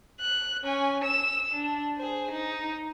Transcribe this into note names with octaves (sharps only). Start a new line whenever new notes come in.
F#6
C#4 G#5
E6 E7
D4
G#4 C5
D#4